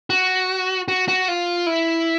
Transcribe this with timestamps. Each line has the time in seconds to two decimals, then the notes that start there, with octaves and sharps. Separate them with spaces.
0.10 F#4
0.88 F#4
1.08 F#4
1.28 F4
1.67 E4